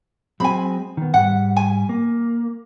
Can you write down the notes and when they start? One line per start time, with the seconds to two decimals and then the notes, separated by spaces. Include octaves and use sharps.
0.40 F#3 G#3 C4 G#5 B5
0.97 D#3 B3
1.14 G#2 G3 F#5
1.56 G#5
1.89 A#3